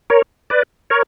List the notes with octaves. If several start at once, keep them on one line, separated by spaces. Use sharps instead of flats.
A#4 C#5
B4 D5
A#4 C#5